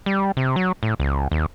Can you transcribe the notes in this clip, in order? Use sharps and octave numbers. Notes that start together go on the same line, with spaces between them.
G3
C3
F#3
A2
C#2
D#2